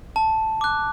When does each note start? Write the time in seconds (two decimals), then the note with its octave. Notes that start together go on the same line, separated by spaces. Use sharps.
0.16 A5
0.61 D6 F#6